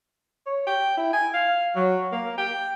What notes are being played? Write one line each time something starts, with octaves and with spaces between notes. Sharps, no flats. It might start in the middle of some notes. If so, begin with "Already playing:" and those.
C#5
G5
E4
G#5
F5
F#3
A#3
G5